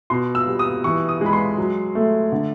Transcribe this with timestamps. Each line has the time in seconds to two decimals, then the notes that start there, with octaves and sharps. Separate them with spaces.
0.10 B2 C6
0.35 E6
0.47 G3
0.59 D#6
0.84 E3 C#6
1.09 D#6
1.21 G#3 B5
1.33 C6
1.58 F#3
1.95 A3
2.32 D3